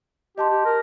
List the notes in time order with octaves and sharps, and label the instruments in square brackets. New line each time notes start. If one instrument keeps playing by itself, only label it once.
[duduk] G4 [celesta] D#5 A5 C6
[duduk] G4
A#4